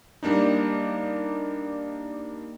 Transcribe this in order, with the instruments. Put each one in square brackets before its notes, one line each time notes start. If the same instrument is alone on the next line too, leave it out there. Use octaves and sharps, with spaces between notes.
[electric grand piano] G3 A#3 D4 D#4